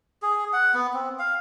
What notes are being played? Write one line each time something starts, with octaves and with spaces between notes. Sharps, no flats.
G#4
F#5
B3
C4
F5